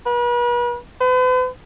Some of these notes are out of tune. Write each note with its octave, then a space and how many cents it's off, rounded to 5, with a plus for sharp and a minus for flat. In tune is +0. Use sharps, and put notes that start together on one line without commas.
B4 -40
B4 +45